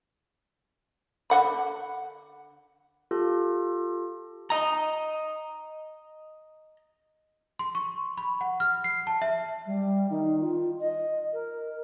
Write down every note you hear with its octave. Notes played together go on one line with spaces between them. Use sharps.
D3 F#5 B5
F4 G4 A4
D#5 A#5
C6
C#6
B5
F#5
F6
C7
A5
E5
G3
D#3
F4
D#5
A#4